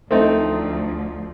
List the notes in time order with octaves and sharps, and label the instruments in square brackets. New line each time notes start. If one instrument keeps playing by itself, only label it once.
[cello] D2 F3 [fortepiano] A3 C4 D#4